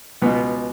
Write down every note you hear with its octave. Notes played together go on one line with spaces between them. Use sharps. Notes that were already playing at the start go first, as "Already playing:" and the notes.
C#2 B2 B3